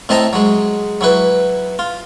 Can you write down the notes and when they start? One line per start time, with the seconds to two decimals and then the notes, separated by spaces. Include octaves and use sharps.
0.09 A2 C4 D#5 E5 A5 A#5
0.33 F#3 G#3
1.01 F#3 E4 B4
1.79 F4